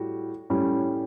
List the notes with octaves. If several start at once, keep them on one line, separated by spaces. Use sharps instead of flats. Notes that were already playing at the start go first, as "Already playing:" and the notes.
Already playing: A2 G3 F#4
A2 G3 C#4